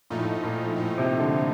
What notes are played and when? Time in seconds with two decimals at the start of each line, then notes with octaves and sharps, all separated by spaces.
0.10 A#2 F3 A3 D#4
0.17 A2
0.25 A#2
0.44 A#2
0.76 A2 F3 A3 D#4
0.98 C3
1.19 D3